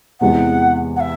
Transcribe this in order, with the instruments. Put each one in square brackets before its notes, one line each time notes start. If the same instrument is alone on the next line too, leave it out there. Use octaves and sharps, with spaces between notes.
[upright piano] E2 C3 E3 G#3 [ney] F#5
[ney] F#5
E5